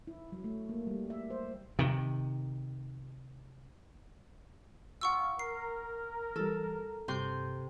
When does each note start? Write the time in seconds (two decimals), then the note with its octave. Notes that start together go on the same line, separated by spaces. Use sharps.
0.07 E4
0.32 F#3
0.44 A3
0.69 A#3
0.87 G3
1.10 E5
1.30 C5
1.79 C3 D#3
5.01 G3 D4 F4 F#5 C#6 E6
5.39 A#4 C7
6.36 E3 G3 A4
7.08 G2 C3 C6 G6